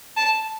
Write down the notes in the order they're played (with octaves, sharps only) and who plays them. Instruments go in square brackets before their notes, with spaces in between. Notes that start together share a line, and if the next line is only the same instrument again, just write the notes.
[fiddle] A5